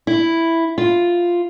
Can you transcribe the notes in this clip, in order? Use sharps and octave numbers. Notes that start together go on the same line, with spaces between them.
E4
F4